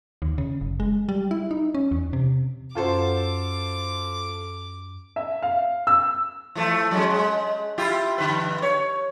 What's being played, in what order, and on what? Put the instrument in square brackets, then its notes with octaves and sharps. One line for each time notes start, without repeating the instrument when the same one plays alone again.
[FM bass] D#2
C#3
F#1
G#3
G3
E4
D#4
C#4
E2
C3
[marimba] F#2 C#4 F#5 [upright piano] F4 A4 C5 [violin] D6
[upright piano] E5
F5
E6
[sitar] E3 F3 A3
F#3 G#3 C#4
G#3
E4 F4 G4
G2 D3 B4
C#5